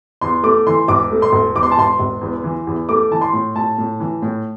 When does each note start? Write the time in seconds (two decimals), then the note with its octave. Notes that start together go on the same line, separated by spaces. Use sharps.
0.21 E2 C6
0.43 A3 D6
0.67 E3 C6
0.88 E1 D6
1.11 A3
1.22 C6
1.32 E1
1.55 E2 D6
1.63 C6
1.72 A5
1.78 E1 C6
1.99 E1
2.21 E2
2.44 E3
2.67 E2
2.89 A3 D6
3.11 E3 A5
3.21 C6
3.33 A2
3.55 A2 A5
3.78 A2
4.00 E3
4.22 A2